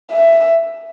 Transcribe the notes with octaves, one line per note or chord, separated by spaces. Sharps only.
E5